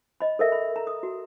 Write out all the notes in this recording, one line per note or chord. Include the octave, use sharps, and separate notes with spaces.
D#5 B5
A4 A#4 E5
B5
A#5
D#6
F#4